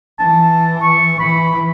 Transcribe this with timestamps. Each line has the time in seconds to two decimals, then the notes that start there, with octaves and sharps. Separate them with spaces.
0.19 E3 A5
0.83 C#6
1.20 E3 B5